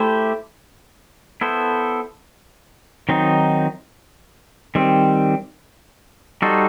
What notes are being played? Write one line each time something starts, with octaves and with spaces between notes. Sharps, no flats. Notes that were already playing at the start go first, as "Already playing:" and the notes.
Already playing: A3 E4 G4 C5
B3 E4 A4 C5
D#3 F#3 C4 D#4
D#3 G3 C4
G3 D#4 F#4 A4 C5